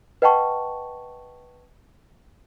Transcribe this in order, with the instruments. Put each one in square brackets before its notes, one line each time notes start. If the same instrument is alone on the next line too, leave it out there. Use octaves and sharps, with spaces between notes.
[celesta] B4 D#5 F#5 G5 A5 C#6